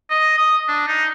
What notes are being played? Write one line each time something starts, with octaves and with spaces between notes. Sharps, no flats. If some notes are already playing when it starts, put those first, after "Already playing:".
D#5
D#6
D4
D#4